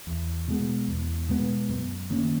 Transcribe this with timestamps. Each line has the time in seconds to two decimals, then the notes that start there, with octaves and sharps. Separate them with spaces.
0.07 E2
0.48 B2 G#3 B3
0.88 E2
1.29 B2 G#3 B3
1.69 F#2
2.10 D#3 A#3 C#4